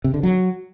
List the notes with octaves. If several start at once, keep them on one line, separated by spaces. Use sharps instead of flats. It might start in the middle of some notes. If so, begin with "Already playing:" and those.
C3
D3
F#3